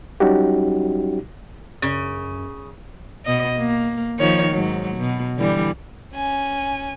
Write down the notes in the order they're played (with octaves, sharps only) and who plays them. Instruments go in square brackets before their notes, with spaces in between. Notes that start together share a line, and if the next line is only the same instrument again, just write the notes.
[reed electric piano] F#3 G3 C#4 D#4 F#4 G4
[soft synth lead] F#2 [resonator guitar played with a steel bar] C#3
[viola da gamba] B2 D#5
A#3
D#3 F3 C#5
G#2 F#3
B2
D3 E3 G3
[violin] C#4 G#5